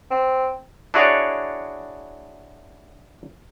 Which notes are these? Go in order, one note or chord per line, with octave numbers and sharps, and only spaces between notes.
C4
D4 E4 F#4 G#4 C#5 D5